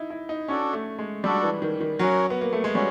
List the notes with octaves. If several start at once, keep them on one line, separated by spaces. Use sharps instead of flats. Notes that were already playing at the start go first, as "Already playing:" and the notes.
Already playing: D#4 E4
E4
D#4
C#4 D4 F#4 A4 D5
A3
G#3
G3 D4 F#4 A4 D5
E3
D#3
D#3
F#3 C#4 F#4 A#4
B3
A#3
A3
G#3
G3 C#4 F#4